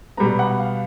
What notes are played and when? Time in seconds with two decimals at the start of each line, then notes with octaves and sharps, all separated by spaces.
0.17 B2 G3 B3 A#5
0.39 F#5
0.60 F5